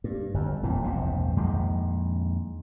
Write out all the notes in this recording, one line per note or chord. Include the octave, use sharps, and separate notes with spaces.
G2
G1 F2
E1 F2 A#2 E3
E1 A#1 G2 C3
A#1 F2 D#3 G#3